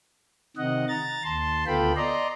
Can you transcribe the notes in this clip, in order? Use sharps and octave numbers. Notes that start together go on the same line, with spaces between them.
C3 D#3 D#5 F#5
A#5 A6
D#2 A5 C6
D2 B3 F4 A4 G5 B5
D5 D#5 A#5 C6